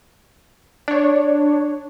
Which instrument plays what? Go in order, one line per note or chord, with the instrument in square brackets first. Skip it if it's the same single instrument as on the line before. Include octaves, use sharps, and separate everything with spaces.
[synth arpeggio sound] D4 C#5